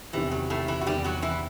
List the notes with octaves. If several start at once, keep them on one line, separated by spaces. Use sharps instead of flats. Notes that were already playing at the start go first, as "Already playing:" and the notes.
E2 C3 D#3 E3
F#3
A2 A3
E3 E4
F#4
E2 C3 D#3 G3 G4
F#3 F#4
E3 E4